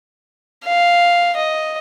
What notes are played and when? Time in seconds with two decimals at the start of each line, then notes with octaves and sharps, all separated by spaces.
0.65 F5
1.36 D#5